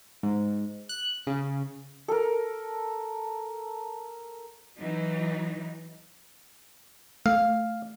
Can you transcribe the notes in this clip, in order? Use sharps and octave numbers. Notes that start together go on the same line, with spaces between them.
G#2
F#6
C#3
A4 A#4
E3 F#3 D#4
A3 F5